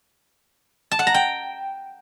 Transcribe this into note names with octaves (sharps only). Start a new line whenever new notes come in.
A5
F#5
A#5
G5